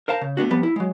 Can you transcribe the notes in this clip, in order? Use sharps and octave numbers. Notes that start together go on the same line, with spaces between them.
A#4 C5 F5 A5 A#5
C#3
A3 B3 D4 F#4
F3 G3 B3
E4
F#3 G#3